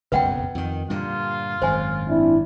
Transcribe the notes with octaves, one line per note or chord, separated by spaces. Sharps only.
F#1 B1 F2 B4 F#5 G5
F2 D#3
G2 A#2 D3 F4
G#1 F#2 C5 G#5
C4 D4 E4